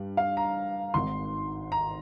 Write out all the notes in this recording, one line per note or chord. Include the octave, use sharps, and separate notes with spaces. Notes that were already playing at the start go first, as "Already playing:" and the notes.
Already playing: G2 G3
F5
A#5
G#1 G#2 D#3 C6
A#5